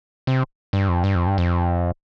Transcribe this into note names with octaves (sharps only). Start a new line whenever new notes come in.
C3
G2
F2
G2
F2
G2
F2